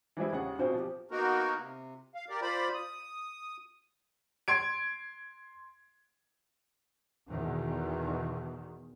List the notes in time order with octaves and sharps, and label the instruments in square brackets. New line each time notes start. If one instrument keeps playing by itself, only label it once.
[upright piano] E3 F3 G3 G#3 E4
D#2 C#3 G#4 F#5
B1 B2 C4 F4 C5 G#5
F3 G4
[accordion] A#3 B3 D#4 F#4 A#4
C3
F5
G4 A#4 D5
F4 C5 D5 B5
D#6
[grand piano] C6 G#6 D7
[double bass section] E2 B2 D#3